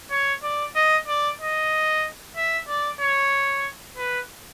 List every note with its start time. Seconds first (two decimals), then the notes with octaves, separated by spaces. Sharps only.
0.11 C#5
0.43 D5
0.75 D#5
1.08 D5
1.40 D#5
2.37 E5
2.68 D5
3.00 C#5
3.97 B4